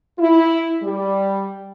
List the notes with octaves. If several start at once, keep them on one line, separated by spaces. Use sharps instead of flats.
E4
G3